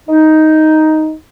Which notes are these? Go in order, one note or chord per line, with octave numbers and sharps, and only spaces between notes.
D#4